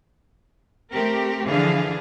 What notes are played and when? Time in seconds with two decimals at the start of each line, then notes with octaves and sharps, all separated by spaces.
0.94 A3 C4 G4 A#4
1.47 D3 E3 F3 D4 G#4 F5